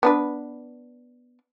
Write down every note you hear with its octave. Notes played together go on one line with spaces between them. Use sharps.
B3 D4 B4